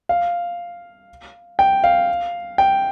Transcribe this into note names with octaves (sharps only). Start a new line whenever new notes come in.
F5
G5
F5
G5